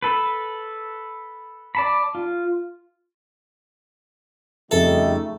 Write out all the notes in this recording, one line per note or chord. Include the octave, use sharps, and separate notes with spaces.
A4 B4
D5 A5 B5
F4
F2 C#3 G3 A3 D#4 G#4 A4 E5